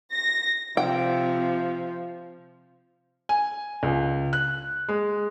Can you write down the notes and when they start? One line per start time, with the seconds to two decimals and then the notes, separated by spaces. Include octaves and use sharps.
0.13 A#6
0.77 C3 F3 G5
3.29 G#5
3.83 C#2
4.33 F#6
4.89 G#3